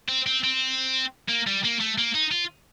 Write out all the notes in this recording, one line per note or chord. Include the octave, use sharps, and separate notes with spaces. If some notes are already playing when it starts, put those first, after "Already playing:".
C4
C4
C4
A#3
G3
A#3
A3
A#3
D#4
F4